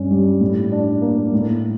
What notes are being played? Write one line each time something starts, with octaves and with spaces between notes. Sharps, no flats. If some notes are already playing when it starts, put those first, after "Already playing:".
Already playing: G2 C#4
G3
A2
D4
A#3
A2